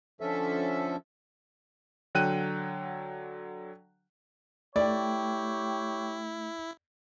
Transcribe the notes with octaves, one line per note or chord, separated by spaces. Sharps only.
D3 F3 C#4 A4 E5
D3 F#3 G5 F#6 D#7
A3 E4 G4 C#5 D5 G5